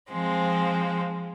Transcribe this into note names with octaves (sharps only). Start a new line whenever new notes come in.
F3 G#3 C4